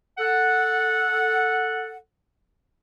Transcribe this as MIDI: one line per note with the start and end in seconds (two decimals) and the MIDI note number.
0.18 1.97 69
0.18 1.97 78